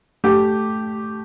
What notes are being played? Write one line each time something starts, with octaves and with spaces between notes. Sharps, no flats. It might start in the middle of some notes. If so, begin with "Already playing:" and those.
A3 G4